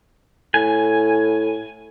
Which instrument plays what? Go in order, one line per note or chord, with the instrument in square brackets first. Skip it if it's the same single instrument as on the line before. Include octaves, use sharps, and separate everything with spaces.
[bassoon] A2 [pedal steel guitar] G#5